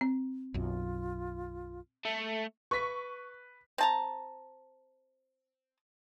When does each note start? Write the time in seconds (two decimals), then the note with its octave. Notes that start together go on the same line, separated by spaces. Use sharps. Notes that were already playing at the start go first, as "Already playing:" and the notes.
0.01 C4
0.54 B1 F#2 F4
2.05 A3
2.71 B4 C#6 B6
3.78 C4 A5 A#5